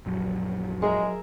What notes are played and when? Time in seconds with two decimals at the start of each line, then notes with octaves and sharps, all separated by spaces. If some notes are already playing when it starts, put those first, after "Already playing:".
0.06 A#1 F#2 F#3
0.82 G#3 G#4 A#4 E5